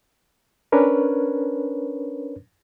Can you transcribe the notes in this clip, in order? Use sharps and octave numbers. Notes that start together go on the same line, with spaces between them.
C#4 D4 A#4 B4 C#5